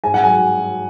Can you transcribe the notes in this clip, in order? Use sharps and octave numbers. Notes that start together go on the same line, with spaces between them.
G#2 G#5
F#5
F#3 G#5